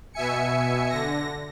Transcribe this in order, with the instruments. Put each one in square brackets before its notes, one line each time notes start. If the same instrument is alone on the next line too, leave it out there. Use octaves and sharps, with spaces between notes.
[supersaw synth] B2 E5 G#5 C#7
D3 A#6